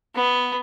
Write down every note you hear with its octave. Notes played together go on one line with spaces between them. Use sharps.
B3